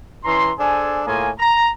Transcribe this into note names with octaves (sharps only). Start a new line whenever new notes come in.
E3 C#4 A#5 C6
D4 G#4 A4 C5 G#5
A2 A#3 F4 G#4 G#5
A#5